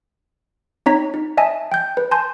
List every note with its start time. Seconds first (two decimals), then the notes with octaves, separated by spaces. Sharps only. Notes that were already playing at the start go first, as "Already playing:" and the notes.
0.86 C4 D#4 C#5 A#5 B6
1.14 D#4
1.37 D#5 E5 G#5 A5
1.72 G5 G6
1.97 B4
2.11 G#5 A5 C6 G6